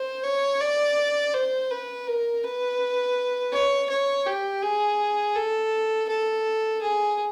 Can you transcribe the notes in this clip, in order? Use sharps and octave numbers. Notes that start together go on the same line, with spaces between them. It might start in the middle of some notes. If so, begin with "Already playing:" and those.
Already playing: C5
C#5
D5
C5
B4
A#4
B4
C#5
C#5
G4
G#4
A4
A4
G#4